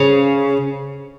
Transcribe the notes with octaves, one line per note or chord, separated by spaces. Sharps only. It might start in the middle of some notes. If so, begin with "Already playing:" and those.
Already playing: C#3